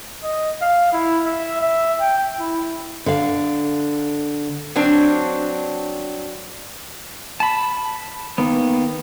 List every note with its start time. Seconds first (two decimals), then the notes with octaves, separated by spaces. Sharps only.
0.24 D#5
0.62 F5
0.93 E4
1.26 E5
1.61 E5
2.00 G5
2.40 E4
3.06 D3 F5
4.76 F#3 C4 D4
7.40 A5 B5
8.38 D#3 A#3 B3